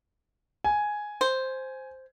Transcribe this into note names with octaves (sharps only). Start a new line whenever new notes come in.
G#5
C5